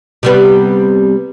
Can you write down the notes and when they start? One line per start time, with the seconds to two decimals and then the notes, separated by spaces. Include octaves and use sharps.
0.23 C3 G3 B3